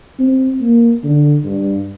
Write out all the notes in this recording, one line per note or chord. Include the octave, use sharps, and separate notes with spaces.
C4
A#3
D3
G2